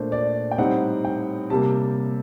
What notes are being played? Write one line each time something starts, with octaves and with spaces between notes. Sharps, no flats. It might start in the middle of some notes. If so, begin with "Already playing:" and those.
Already playing: A#2 A3 D4 C5
D5
G5
A2 G3 C4 D#4 F#5
G5
C3 G3 A#3 A5